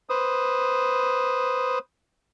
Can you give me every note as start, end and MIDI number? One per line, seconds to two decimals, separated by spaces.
0.09 1.79 71
0.09 1.79 72
0.09 1.79 87